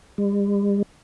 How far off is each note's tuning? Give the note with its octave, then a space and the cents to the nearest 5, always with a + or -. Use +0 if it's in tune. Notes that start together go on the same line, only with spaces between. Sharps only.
G3 +45